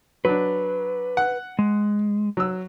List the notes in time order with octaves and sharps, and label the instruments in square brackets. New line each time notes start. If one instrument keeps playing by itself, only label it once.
[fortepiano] F#3 D4 [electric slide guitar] B4
[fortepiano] F#5
[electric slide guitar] G#3
[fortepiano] F#3 E6